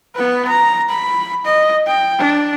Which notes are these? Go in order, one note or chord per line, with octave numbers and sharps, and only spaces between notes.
B3 B4
A#5
B5
D#5
G5
D4